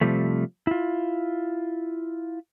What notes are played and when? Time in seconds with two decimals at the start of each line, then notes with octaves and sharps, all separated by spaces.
0.01 C3 F3 G3 A3
0.67 E4 F4